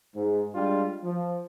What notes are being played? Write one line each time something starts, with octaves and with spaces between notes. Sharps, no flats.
G#2
G3 G#3 D4 F4
F3